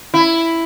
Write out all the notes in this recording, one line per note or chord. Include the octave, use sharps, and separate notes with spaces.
E4